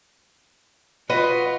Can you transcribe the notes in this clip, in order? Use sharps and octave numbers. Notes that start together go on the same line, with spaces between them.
F4 F#4 B4 D#5